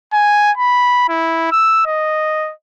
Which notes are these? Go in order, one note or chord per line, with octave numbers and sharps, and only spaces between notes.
G#5
B5
E4
E6
D#5